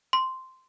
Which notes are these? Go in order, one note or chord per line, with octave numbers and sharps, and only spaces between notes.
C6